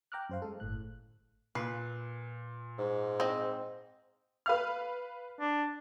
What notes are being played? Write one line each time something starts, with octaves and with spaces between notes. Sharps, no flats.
G5 A#5 D6 F6 F#6
F#2 C5 F5
G#3 A4
G1 A2 F#6
A#2 B4 C7
G#2
C4 D#5
B4 F5 F6
D4